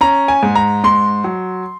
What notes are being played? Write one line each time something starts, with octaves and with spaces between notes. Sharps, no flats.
C#4 A#5
G#5
G#2
A#5
G#2 C6
F#3